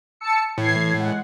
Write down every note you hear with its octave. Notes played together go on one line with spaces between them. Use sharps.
A5 E6 C#7
A2 E3 G#6 C7
G#3 F#5